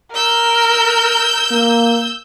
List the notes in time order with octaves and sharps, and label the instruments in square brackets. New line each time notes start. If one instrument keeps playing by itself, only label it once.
[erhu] A#4 [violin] E6 G6
[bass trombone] A#3